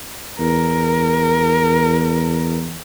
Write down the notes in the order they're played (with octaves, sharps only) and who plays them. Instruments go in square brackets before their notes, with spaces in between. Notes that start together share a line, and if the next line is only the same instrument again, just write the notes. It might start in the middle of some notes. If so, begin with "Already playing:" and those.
[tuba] E2 [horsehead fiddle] A#4